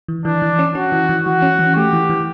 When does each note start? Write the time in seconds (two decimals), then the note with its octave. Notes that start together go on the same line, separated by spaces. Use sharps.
0.08 E3
0.25 E3 D4
0.42 E3
0.59 C#4
0.75 C#4 F#4
0.92 E3
1.09 E3
1.26 E3 F#4
1.42 C#4
1.59 E3
1.76 A3 G4
1.93 E3
2.10 E3